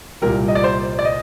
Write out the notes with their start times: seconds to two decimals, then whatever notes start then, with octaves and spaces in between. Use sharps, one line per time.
0.22 C2 A#2 G3 A#4
0.48 D#5
0.55 D5
0.64 C5
0.99 D5
1.05 D#5